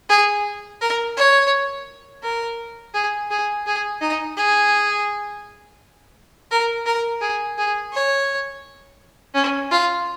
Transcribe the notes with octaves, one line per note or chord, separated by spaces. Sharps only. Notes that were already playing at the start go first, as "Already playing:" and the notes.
G#4
A#4
C#5
A#4
G#4
G#4
G#4
D#4
G#4
A#4
A#4
G#4
G#4
C#5
C#4
F4